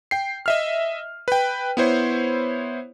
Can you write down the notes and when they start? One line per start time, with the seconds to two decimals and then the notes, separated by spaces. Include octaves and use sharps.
0.11 G5 C7
0.46 D#5 E5 F6
1.28 B4 G5
1.77 B3 E4 C5 C#5